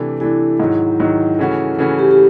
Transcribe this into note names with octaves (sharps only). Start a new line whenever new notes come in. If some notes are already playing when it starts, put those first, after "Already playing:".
Already playing: C3 E3 A3 D4
C3 E3 A3 D4 E4
G#2 D#3 F#3
G#2 D#3 F#3
C#3 E3 A3 C#4 F#4
C#3 E3 A3 C#4 F#4
G4
G4